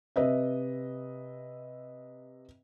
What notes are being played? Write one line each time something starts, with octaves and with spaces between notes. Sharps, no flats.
C3 B4 D#5 E5